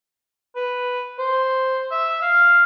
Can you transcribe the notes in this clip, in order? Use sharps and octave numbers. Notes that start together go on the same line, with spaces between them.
B4
C5
E5
F5